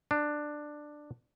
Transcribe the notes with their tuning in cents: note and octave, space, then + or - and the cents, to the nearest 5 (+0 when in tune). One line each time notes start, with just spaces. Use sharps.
D4 +10